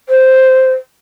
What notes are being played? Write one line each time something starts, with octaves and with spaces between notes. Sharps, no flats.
C5